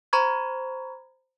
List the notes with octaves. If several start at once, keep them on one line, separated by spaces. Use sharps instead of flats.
C5 A#5 B5 C#6 G#6